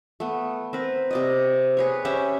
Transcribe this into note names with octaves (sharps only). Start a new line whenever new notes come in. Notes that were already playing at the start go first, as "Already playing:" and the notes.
A3 B3
C4 A#4 B4
C3 D5 D#5
G#4 B4 C#5
C#4 G4 E5